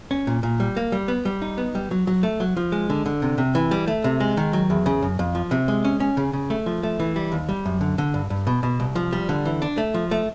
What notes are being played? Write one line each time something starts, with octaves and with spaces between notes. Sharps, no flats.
C#4
A#2
A#2
G3
A#3
G3
B3
G3
D#4
B3
G3
F#3
F#3
A3
F#3
F3
G#3
D3
D3
C3
C3
E3
G3
A3
C3
G#3
D#3
F#3
E2
C#3
F#2
F2
F3
C3
G#3
C#4
C#4
C#3
C#3
A3
F3
A3
E3
G3
D#2
G3
F#2
D3
D3
G2
G2
B2
B2
C2
F3
G3
D3
E3
D4
A3
F3
A3